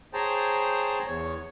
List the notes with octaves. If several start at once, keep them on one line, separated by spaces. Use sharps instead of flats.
G#4 C5 C#5 G5 A5 A#5
E2 C#5